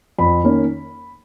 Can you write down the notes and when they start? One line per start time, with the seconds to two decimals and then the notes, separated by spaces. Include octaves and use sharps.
0.18 F2 B5
0.43 D#3 A#3 C#4